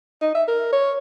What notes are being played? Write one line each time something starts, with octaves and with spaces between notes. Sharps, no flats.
D#4
E5
A#4
C#5